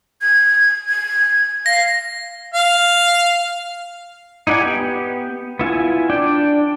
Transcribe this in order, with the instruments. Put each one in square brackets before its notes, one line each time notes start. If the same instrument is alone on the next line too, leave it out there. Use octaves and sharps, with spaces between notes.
[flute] G#6
G#6
[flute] F5 [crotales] A#6
[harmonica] F5
[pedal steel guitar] D#4 E4 D5 F#5 G#5
B3 G4
B3 E4 F4 G#5
D4 D5 G5